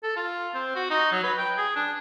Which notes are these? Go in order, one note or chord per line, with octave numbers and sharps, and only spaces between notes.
A4
F4
C4
F#4
D#4
F#3
B4
G5
G#4
D4